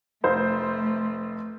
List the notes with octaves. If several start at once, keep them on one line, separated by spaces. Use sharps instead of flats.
F1 A3 C5